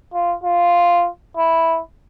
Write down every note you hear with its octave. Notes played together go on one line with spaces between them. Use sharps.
F4
F4
E4